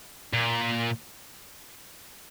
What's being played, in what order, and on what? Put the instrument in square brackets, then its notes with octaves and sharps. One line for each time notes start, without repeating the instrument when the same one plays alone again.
[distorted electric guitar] A#2